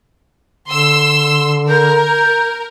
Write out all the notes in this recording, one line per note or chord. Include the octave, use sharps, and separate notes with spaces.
D3 C6 E6
A#4 G6